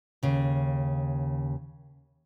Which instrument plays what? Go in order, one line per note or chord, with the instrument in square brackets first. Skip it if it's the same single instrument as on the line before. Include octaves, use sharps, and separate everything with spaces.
[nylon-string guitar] D#2 C#3